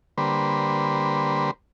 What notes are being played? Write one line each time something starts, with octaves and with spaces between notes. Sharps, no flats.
D3 G3 A#3 B4 C5